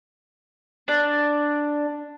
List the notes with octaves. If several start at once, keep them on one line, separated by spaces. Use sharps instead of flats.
D4